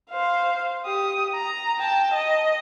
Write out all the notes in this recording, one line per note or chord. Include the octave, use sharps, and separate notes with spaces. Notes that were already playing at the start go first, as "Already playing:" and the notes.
C5 F5
G4 D#6
A#5
G5 A5
D#5